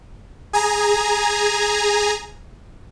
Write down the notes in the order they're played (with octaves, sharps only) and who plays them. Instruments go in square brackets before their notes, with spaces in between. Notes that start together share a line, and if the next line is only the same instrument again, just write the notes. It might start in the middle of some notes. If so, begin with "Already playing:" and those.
[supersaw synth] G#4 G#5 A#5